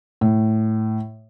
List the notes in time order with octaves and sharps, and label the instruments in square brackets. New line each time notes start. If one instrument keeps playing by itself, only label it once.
[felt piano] A2